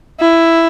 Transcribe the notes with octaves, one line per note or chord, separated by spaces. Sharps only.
E4